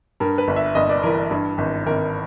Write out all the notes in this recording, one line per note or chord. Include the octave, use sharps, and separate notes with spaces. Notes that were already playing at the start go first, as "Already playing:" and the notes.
G2 A#4
B4
G1
E5
G1 D#5
D5
E3 A#4
G2
G#1
G#1 A#4